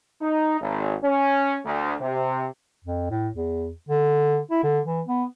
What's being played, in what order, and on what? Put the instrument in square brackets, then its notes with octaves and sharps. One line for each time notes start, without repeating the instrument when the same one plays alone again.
[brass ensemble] D#4
G#1
C#4
D2
C3
[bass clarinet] F2
A2
E2
D3
E4
D3
E3
B3